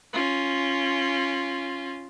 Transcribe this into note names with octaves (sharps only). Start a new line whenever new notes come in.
C#4 F4